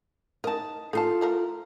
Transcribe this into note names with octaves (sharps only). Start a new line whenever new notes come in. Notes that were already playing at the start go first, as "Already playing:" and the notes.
D#4 A#4 D#5 A5
D#4 F4 A4 A5
F3 A3 A#4